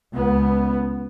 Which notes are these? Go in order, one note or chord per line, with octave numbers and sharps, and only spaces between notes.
C#2 B3